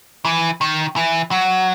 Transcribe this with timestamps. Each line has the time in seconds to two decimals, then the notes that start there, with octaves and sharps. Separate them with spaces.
0.25 E3
0.61 D#3
0.96 E3
1.31 F#3